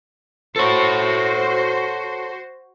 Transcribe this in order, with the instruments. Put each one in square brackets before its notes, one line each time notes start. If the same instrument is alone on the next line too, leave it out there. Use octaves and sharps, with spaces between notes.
[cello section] F#4 C5 [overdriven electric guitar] A4 C#5